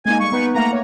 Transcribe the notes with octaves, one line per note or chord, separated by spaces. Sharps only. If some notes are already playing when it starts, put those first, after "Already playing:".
G#3 A#3 D#4 G#5
G3 C#6
B3 D#4 B4
A3 A#3 F#5 A#5
A#3 C#5